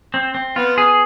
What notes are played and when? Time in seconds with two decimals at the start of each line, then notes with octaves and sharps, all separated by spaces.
0.14 C4
0.35 C4
0.56 B3 F4
0.78 G#4